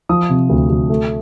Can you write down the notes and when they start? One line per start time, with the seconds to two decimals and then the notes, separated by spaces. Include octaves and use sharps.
0.09 F3 D#6
0.30 C3
0.49 D2
0.69 D2
0.90 A3